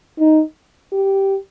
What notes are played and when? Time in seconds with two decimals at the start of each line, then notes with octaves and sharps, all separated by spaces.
0.19 D#4
0.92 G4